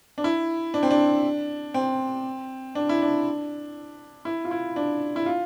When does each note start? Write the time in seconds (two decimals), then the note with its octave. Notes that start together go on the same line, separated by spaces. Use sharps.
0.18 D4
0.24 E4
0.74 D4
0.83 C4
0.91 D4
1.74 C4
2.75 D4
2.89 E4
3.02 D4
4.25 E4
4.45 F4
4.51 E4
4.76 D4
5.16 E4
5.26 F4